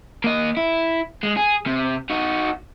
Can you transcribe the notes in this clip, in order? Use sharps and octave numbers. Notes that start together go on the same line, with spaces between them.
A#3 D#5
E4
G#3
G#4
C3
D#4 F#4